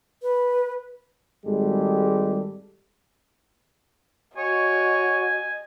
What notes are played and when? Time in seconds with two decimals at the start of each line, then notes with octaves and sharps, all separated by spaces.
0.23 B4
1.45 G#1 G3 G#3 G4 A4
4.37 F#4 C#5 D#5 G#5